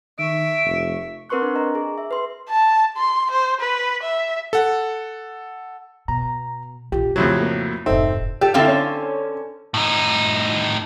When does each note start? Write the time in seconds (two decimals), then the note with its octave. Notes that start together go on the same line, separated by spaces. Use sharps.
0.19 D#3 E5 C#6 D7
0.65 F1
1.29 C4 A#4 B4 C6 C#6 F#6
1.42 D4
1.55 D#5 A#5
1.75 G#4
1.98 E5
2.11 B4 C6
2.49 A5
2.97 C6
3.31 C5
3.61 B4
4.03 E5
4.53 A4 F#5
6.08 B2 A#5
6.92 A#1 F4 G4
7.16 F2 A2 C#3 F#3
7.42 A#3
7.86 F1 G#2 C4 D#4 A4 E5
8.41 G4 A4
8.54 D3 C4 E4 A4 F5
8.68 C#4
9.74 A2 D#4